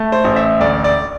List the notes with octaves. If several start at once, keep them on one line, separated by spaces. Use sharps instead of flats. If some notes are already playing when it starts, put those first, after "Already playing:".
Already playing: A3
C5
A1
E5
D2 D5
D5